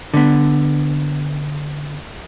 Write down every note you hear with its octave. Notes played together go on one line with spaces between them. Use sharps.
D3 B3